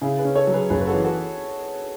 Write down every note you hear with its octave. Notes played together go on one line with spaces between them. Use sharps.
C#3 E4 G#4
G#4 B4
C#4
A4 C#5
F#3
G#4 B4
F#1 G#4 B4
B4
F#4 A4
E3
F#4 A4